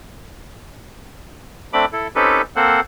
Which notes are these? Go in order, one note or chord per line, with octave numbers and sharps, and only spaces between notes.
A3 C4 D4 B5 D6
E4 A4
C4 C#4 D#4 G4 A4 B4
A#3 C4 A4 C5 F#5